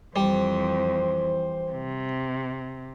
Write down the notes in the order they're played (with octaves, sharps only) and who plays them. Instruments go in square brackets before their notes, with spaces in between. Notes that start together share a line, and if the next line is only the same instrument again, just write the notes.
[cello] F2 [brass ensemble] E3 C5 [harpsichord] G3
[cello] C3